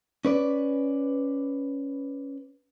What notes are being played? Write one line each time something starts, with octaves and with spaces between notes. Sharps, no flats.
C#4 B4 D5